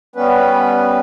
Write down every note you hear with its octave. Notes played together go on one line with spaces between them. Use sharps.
G3 B3 C#4 B4